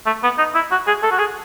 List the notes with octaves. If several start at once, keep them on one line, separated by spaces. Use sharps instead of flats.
A3
B3
D#4
E4
F#4
G#4
A4
F#4
G#4